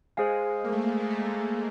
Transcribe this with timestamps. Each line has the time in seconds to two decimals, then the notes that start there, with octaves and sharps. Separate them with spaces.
0.17 G#3 G#4 C5 F5 G#5
0.64 A#3
0.72 A3
0.80 A#3
1.01 A#3
1.10 A3